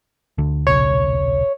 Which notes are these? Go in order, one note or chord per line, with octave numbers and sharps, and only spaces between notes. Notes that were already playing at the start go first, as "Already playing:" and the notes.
D2 D3
D#1 B1 C#3 C#5